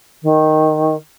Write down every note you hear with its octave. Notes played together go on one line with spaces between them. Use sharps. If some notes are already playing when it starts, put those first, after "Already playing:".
D#3